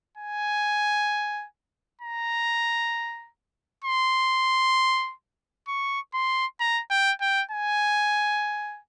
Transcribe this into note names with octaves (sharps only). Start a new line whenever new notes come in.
G#5
A#5
C6
C#6
C6
A#5
G5
G5
G#5